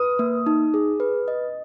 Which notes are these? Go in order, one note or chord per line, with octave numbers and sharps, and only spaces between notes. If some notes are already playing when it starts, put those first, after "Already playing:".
Already playing: B4 D#6
A#3
D#4
G#4
B4
D#5